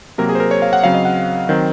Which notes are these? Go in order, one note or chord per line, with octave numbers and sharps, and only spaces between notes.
C3 F#3 A#3 A#4
G#4
C5
A#4
C#5
F5
F#5
C#3 F#3 C4 F5
D#5
F#5
D#3 F#3 C4